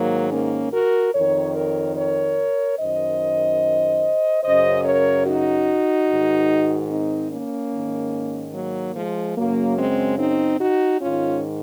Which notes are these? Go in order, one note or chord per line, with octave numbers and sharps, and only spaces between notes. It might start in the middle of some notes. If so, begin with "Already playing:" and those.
Already playing: G#2 D#3 F#3 A#3
A#3 C#4
F#4 A#4
F2 D#3 A#4 C#5
A#4 C#5
A#4 C#5
F#2 D#3 C5 D#5
F#2 C#3 C5 D#5
A#4 C#5
D#4 F#4
G#2 D#3
C4 D#4
A#3 C#4
G#2 D#3
F#3 A#3
F3 G#3
F#2 C#3 F#3 A#3
G#3 C4
C4 D#4
D#4 F#4
G#2 D#3 C#4 F4